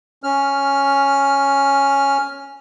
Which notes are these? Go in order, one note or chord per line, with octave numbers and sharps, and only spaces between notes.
C#4 F6